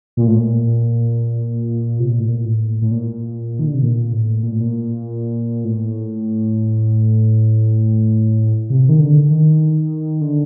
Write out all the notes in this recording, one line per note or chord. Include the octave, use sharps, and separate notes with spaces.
A#2
A2
A#2
C3
A#2
A2
A#2
A2
A2
A#2
D#3
D3
C3
A#2
A2
A#2
A2
A#2
A2
C3
D#3
D3
D#3
D3